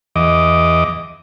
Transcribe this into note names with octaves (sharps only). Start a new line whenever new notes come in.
E2 D#5 D6